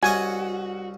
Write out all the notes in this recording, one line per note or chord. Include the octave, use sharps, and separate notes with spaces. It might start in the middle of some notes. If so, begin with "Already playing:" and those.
C2 C#4 F#4 D#5 G#5